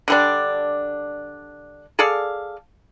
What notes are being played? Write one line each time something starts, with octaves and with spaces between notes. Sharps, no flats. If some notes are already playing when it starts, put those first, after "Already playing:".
D3 G3 D4
G#4 A4 D5 F5